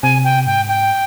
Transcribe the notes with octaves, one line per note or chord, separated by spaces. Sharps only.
C3 G#5
G5
G#2 G5
G5